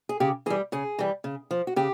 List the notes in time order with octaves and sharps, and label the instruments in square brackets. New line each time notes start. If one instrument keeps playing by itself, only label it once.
[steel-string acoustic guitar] G#4
C#3 G4
E3 G#4
G3
C#3 G#4
E3 G3
C#3
F3
F#4
C#3 G4